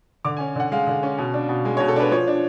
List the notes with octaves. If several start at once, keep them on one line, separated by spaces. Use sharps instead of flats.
D3 D6
G#5
C#4
D3 F#5
G#3 F5
D3
C#4
B2
D4
B2
G#3
C#5
B2
A4
D4 B4
F3 C#5
D4